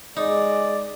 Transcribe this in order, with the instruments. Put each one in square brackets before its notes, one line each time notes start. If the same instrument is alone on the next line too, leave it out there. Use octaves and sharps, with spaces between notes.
[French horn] G#3 [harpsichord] D#4 [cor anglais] D5